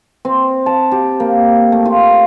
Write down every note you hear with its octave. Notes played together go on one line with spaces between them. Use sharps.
C4
A5
G4
A#3
A3
F4